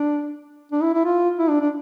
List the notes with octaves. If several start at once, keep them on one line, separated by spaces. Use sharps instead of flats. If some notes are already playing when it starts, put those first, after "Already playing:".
Already playing: D4
D4
E4
E4
F4
E4
D4
D4